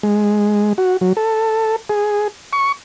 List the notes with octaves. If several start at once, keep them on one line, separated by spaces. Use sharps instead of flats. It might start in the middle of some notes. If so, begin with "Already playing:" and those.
G#3
F#4
F#3
A4
G#4
C#6